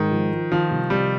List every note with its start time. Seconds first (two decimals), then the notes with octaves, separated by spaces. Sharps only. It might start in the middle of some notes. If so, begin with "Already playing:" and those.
Already playing: G#2 D#3
0.11 F3
0.32 F4
0.51 D#3 F3
0.70 C2
0.90 C3 G3